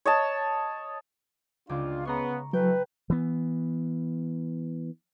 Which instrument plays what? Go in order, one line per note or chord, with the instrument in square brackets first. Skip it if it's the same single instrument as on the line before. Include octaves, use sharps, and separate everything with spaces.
[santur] C#5 D#5 A5
[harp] C#2 C4 D6 [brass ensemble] D4 F4
[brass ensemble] C#3 B3 [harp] A#5 C6 C#6
[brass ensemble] E3 A3 [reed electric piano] F#3 [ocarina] B4 [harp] G5
[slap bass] E3 B3